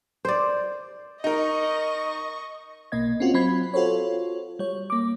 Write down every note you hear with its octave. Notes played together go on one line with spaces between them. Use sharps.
C5 D5
D#4 A#4 D#5 C#6
B1 B2 A#3 D#5 G#6
C4 C#4 F4 F#4
F#3 C4 B5 G#6
F4 F#4 A4 C5 C#5
G3 C#5
A#3 D6